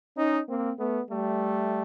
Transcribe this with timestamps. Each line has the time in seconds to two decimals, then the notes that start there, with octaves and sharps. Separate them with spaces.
0.17 C#4 D#4
0.48 A#3 C4
0.79 A3 B3
1.10 G3 A3